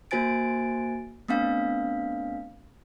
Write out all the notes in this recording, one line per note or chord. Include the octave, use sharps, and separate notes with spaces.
A#3 F#4 C5 G#5 A6 D7
A3 B3 C4 D4 F5